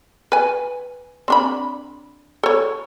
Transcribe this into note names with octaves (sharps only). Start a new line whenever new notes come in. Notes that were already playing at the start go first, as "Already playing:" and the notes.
B4 G#5
C4 D4 B5
A4 C#5